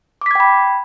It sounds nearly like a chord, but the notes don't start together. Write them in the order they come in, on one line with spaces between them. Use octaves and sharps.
D6 B6 G#6 G5 B5